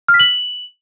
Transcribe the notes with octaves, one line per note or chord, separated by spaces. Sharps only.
F6
B6
F#7